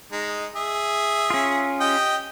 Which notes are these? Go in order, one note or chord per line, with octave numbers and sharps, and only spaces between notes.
G#3 D#4
G#4 E5
C#4 F4
G4 D#5 G5